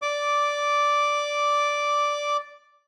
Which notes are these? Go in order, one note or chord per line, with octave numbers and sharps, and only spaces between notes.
D5 D6